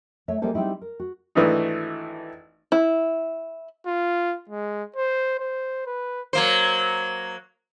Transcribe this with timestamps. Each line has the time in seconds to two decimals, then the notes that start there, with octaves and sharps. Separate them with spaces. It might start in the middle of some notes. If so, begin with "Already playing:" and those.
0.28 A3 A4 C#5 E5
0.41 G3 G#3 A#3 A4 C5 E5
0.54 G3 C4 D#4 E4 G4
0.81 A#4
1.00 F#4
1.35 G#1 E3 A3 D4 D#4
2.72 E4
3.86 F4
4.49 G#3
4.96 C5
5.40 C5
5.86 B4
6.33 F#3 A#3 C5